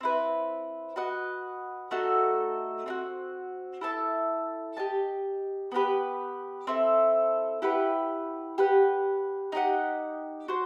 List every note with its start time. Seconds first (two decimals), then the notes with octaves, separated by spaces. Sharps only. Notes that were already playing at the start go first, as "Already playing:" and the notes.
0.01 C4 E4 B4
0.96 F#4 B4 D#5 F#5
1.91 A3 D#4 F#4 A4
2.86 C4 D#4 F#4
3.81 E4 A4 E5 A5
4.77 G4 D#5 A5
5.72 B3 D#4 G4 B4
6.67 C4 E4 A4
7.62 E4 G4 B4 F#5
8.58 G4 B4 F#5
9.52 D#4 G4 D#5 F#5
10.48 F#4 C5